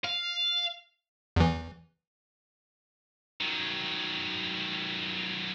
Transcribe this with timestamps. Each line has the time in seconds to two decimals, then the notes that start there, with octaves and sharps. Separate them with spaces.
0.05 F5
1.36 E2 E3
3.40 D#3 F#3